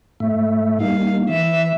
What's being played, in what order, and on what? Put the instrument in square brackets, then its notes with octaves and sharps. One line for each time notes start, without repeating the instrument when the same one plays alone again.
[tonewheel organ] G#2 A3 E5
[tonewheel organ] G3 A#3 D#4 [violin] F5
[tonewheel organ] E3 [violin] E5